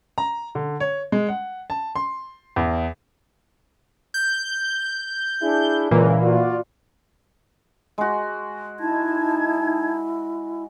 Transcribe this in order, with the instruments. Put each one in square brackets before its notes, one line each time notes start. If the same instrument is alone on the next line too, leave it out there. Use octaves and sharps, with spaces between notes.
[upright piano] A#5
D3
C#5
G#3
F#5
A5
C6
E2
[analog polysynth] G6
[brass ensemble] D4 E4 G#4
[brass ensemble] C#2 [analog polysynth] A#2 E3 A#3
[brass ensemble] F4 F#4 D5
[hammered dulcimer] G#3 F#4
[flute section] D#4 A5 G#6 [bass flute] E4